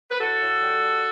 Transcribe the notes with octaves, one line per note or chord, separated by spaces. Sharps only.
B4
A2 F#4 A4
A2
G3
G3